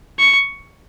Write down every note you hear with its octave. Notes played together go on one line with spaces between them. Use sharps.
C#6